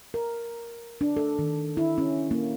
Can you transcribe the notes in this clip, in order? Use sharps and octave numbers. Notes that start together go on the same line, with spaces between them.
A#4
D4
A4
D#3
E4
C#4
A#3